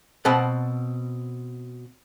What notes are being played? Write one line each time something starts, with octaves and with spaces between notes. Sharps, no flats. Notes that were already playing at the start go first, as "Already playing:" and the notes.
B2 C4 F#5 A5 B5